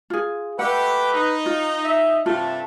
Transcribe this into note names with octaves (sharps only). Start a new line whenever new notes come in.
F4 G#4
A3 G4 B4 F#5
D#4
F4
E5
G2 C3 A3 F4 A5